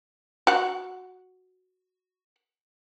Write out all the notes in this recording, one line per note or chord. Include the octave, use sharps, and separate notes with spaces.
F#4 F#5